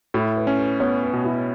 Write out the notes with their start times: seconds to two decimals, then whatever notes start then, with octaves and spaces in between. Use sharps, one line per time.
0.14 A2 E4
0.36 B4
0.47 C#4
0.58 B4
0.80 B3 C#5
1.03 B4
1.13 B2
1.24 E4